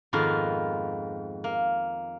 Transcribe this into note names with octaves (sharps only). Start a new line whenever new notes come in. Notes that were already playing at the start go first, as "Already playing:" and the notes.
F2 G#2 D#3 A#3 B3 F4
A#3